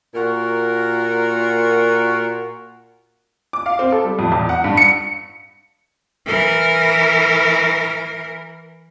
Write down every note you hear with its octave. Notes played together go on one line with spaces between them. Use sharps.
A#2 F#4 A#4
D6
F5
C4
A4
G3
F2
E2
F#5
G2
C#7
E3 A#4